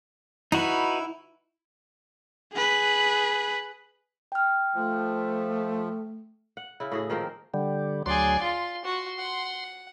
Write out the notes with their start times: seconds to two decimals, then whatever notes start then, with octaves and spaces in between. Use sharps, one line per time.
0.52 D#4 E4 F#4 B4
2.54 G#4 B4
4.32 G5 F6
4.75 F3 A3
6.57 F#5
6.80 C#3 E4
6.92 A2 F#4 G#4
7.10 D#3 F3 A#3 C4
7.54 D3 G3
8.06 D2 F#3 G#4 D5 C6
8.42 F4 C6
8.85 F#4
9.19 F#5